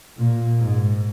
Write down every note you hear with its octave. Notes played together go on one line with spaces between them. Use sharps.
A#2
G#2